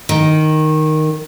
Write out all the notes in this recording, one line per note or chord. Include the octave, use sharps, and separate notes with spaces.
D#3